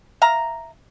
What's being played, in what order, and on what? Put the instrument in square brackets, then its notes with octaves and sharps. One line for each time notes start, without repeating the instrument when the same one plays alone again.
[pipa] E5 F5 A#5